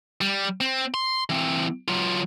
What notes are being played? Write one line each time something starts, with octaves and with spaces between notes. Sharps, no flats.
G3
C4
C6
E3 C4
F#3 F4